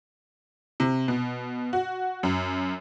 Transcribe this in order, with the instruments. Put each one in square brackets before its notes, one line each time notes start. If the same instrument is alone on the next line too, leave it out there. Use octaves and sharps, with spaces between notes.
[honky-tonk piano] C3
B2
F#4
F#2